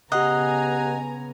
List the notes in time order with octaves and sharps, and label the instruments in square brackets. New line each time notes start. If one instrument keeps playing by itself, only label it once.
[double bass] C#3 B3 [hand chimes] G4 F#5 F#6 [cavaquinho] D#5 [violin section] G#5 A#5